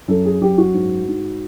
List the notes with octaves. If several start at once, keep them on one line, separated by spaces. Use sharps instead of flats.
F#2 A4
G#4
F#2 G4
F#4
G#2
G#2